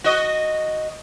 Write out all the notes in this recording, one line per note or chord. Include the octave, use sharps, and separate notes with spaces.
F#4 D#5